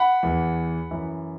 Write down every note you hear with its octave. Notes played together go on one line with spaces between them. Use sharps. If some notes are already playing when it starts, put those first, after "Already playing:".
Already playing: F#5 B5
E2 E3
F#2 E3